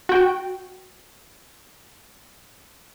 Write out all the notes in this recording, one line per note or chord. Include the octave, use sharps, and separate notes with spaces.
F#4 G5